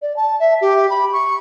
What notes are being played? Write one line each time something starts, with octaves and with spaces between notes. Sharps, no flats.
D5
A5
E5
G4
B5
C#6